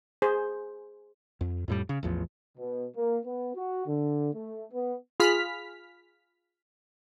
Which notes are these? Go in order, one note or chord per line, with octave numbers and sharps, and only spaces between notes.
G#4 C5
F2
F2 A2 G3
C#3
A1 E2 F3
B2
A#3
B3
F#4
D3
A3
B3
F4 G#4 B5 F6 B6